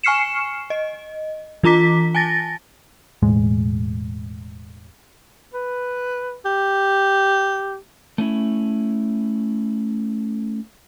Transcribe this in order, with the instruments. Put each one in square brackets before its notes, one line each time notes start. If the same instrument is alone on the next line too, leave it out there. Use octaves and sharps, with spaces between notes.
[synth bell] G#5 C#6 F6 C7 C#7 E7
D#5
E3 F4 A#5 D6 B6
G#5 A5 A6 A#6
[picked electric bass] E1 A2 G#3
[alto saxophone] B4
G4
[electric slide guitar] A3 C#4 E4